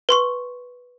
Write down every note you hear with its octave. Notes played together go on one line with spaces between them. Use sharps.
B4 C6 C#6